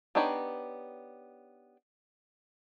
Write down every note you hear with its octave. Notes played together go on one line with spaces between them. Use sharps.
B3 D4 D#4 G4 C#5